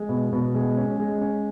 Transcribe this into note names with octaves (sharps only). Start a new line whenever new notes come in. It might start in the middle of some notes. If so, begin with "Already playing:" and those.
Already playing: G#3
B2
B2
G#3
C#4
G#3
C#4